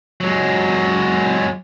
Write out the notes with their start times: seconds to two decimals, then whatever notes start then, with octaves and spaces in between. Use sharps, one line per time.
0.20 F#3 G#3